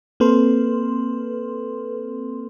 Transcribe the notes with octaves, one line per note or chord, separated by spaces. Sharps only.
A#3 C4 A4 B4 C6